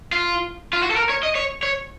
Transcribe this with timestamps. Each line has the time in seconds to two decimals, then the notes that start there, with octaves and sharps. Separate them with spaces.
0.12 F4
0.73 F4
0.83 F#4
0.91 A4
0.96 A#4
1.10 C#5
1.23 D#5
1.35 C#5
1.63 C#5